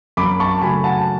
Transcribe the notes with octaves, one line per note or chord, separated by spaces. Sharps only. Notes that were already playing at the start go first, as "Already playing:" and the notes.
F#2 B5 D6
A5 C#6
C#3 F#3 A3 G#5 B5
F#5 A5